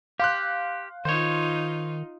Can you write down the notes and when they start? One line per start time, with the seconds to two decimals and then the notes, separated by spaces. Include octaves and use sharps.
0.20 G4 F5 C6 F#6
1.05 D#3 D#4 F4 C5 C#5